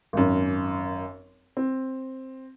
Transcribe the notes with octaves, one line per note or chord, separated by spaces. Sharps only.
G#1 F#2
C4